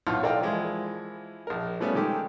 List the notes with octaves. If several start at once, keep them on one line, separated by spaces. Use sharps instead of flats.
B1 A2 F4 F#5 F6
A4 A#4 D5 D#5 F5 G5
E3 F3 G#3 E4
A#1 A#4
F3 G3 A3 B3 C#4
D#3 G#3 G4 A4